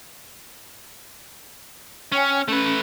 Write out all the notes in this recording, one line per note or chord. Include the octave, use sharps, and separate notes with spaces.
C#4 C#5 G5 G#5
A3 C#4 B4